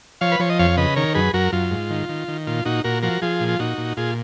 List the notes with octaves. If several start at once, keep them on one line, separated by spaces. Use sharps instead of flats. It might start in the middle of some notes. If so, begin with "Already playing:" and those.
F3 C#5 F5
B4
F3 C#5
D#5
F2 C#5 F5
C#3 B4 D#5
D#3 A#4 C#5
F#2 G#4 B4
F#2 F#4 A#4
F#2 F4
G#2
D#3
D#3
D#3
A#2 F4
A#2 D#4 F#4
A#2 F#4 A#4
F3 F#4 A#4
F3 F4 G#4
A#2
F4
A#2 D#4 F#4
A#2
A#2 F4 G#4